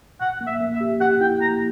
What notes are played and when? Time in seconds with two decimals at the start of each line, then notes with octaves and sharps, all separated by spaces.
0.20 A#2 F#5
0.41 A#3
0.47 E5
0.61 A#3
0.74 E5
0.81 G4
1.00 G4 F#5
1.21 E4 G5
1.41 A#3 A#5